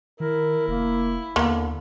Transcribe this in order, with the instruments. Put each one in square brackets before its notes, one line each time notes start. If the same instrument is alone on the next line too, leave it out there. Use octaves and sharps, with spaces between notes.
[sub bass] D#3 [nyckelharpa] E4 [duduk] A#4
[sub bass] F1 [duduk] A#3
[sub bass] D#2 [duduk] D3 [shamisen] A#3 B3